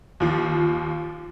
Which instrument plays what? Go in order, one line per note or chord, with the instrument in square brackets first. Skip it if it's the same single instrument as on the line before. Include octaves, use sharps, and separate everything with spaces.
[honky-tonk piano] D#2 F3